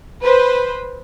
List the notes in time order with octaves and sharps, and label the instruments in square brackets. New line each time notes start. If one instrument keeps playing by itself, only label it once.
[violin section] B4 C5